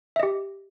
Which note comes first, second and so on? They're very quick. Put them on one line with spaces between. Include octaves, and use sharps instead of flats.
E5 D#5 G4